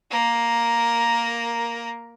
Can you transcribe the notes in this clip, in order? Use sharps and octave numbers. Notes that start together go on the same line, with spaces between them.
A#3 A#4